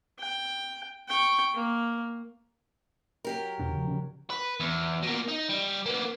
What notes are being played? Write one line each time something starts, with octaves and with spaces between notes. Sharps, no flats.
G5
G5 C#6
A#3
F#3 G4 A#4
E2 B2 D4
C#3 F3
C#3 F3 C#4
B4
E2
B2 A#3
D#4
G3
A#3 B3